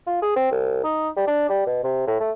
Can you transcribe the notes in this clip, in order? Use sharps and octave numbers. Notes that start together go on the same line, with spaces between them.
F4
G#4
C4
C2
D#4
G3
D4
G3
B2
C3
A2
A3